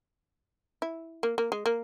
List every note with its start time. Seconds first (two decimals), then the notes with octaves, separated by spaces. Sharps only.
0.82 E4
1.23 A#3
1.38 A#3
1.52 G#3
1.66 A#3